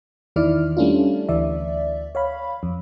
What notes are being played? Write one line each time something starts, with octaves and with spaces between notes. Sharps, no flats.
E2 D#3 E4 D5 F6
G3 A3 C#4 D4 E4 F4
D2 E3 D5 E5
C#5 F5 B5
F2